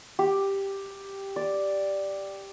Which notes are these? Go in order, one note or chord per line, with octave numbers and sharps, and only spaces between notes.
G4
D5